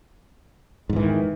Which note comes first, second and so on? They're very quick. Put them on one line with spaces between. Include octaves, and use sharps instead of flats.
G#2 E2 E3 D#3